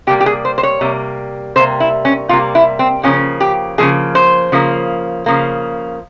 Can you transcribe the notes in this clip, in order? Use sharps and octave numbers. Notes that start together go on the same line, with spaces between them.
C3 G3 A#3 G4
G4
G#4
C5
C5
C#5
C3 G3 A#3
C3 G3 A#3 C5
E4
C#4
C3 G3 A#3 F4
E4
C4
C#3 F3 A#3 C#4
G4
C#3 F3 A#3 G#4
C5
C#3 F3 A#3
C#3 F3 A#3